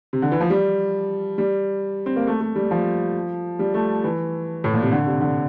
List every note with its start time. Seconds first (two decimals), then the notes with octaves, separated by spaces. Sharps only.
0.13 C3
0.22 D3
0.32 E3
0.40 F3
0.50 G3
1.38 G3
2.06 C4
2.16 A#3
2.27 A3
2.41 A3
2.56 G3
2.71 F3
3.59 G3
3.74 A3
4.04 E3
4.64 A2
4.74 A#2
4.83 C3
4.92 D3
5.06 C3
5.21 D3